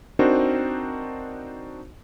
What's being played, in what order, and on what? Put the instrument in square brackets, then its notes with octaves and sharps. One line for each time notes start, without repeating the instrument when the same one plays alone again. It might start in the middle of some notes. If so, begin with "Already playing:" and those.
[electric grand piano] C4 D4 D#4 F#4 A#4 C5